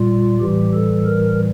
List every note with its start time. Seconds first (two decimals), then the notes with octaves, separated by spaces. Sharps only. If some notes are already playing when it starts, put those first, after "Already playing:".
Already playing: A#2 G3 F4
0.40 A2 E3 G3 G4
0.73 A4
1.06 A#4